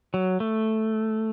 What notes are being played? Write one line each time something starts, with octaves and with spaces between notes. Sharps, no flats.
F#3
A3